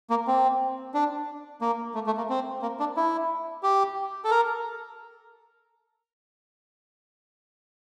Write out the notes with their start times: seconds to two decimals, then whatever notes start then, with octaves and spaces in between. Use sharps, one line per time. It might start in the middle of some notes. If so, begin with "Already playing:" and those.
0.10 A#3
0.27 C4
0.94 D4
1.61 A#3
1.95 A3
2.07 A3
2.17 A#3
2.29 C4
2.62 A#3
2.80 D4
2.97 E4
3.63 G4
4.25 A4
4.31 A#4